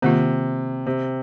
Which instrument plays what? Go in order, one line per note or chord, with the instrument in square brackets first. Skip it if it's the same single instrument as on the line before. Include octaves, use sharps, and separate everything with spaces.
[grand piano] C3 [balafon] D#3 A#3 F4
[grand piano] C3